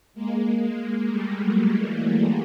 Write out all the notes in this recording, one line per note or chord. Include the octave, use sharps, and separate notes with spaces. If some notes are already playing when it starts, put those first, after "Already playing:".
G#3 A#3
G3 A3
F#3 G#3
E3 F#3